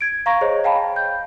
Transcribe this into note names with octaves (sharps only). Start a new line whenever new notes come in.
G#6 D7
F5 A#5 C#6 A#6
G#4 C5 C#5 D#5
F5 G5 A5 B5
G6